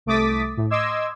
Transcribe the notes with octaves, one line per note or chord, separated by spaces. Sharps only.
C2 A3 D6 D#6 A6 B6
A2
D#5 C6 D6 E6 G#6